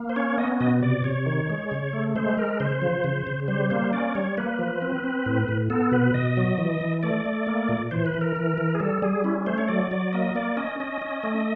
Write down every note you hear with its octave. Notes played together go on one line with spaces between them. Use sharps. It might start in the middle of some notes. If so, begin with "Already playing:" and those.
Already playing: A#3
C5
C#4 C#5
B3 D#5
B2 D#5
C3 D5
C3 C#5
D#3
G#3
C#3
A3
G#3 C5
G#3 A#4
C#3 C5
F3
C#3
C#3
G3 C5
A#3 C5
C#4 D5
G3 C#5
A#3 B4
F3
C4
C4
A2
A2
B3 A4
B2 B4
B2 D#5
F#3
E3
E3
A3 D5
A3
A#3
A#2
E3 C5
B4
E3
A#4
E3
E3
G#4
G3 A4
G3 G#4
C#4 E4
A3 C5
C#5
F#3 D5
F#3 D5
A#3 D#5
A#3 D5
C#4 D#5
C#4 D#5
C#4
A3